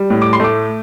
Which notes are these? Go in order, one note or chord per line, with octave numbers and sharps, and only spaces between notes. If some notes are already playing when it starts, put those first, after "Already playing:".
Already playing: G3
A2
D6
C6
A3 D6